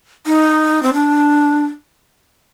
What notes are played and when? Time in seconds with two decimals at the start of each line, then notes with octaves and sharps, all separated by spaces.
0.26 D#4
0.83 C4
0.94 D4